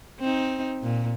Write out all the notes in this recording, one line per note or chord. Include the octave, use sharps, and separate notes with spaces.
C4 D#4
A#2